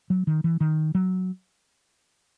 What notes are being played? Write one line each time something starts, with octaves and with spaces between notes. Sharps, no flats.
F#3
D#3
E3
D#3
F#3